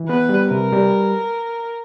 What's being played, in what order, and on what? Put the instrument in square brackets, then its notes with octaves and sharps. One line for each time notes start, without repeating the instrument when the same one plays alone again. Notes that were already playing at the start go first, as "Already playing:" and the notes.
Already playing: [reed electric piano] E3
[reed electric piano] B3 [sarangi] B4
[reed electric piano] G3
[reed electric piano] C3 [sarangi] A#4
[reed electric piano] G3